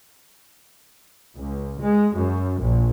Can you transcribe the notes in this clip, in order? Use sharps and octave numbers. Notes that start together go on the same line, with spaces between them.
C#2
G#3
F#2
A#1